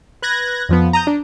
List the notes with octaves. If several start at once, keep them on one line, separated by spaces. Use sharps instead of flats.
B4 F#6 G#6 A#6
F2 F3 B3
A#5 D#6 G6
D4